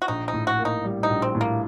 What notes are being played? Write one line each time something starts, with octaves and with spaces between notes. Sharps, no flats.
F#4
A#1 D#4
D#4
A2
F#4
A#3
D#4
G3
D#4
A#1
C4
A2
A#3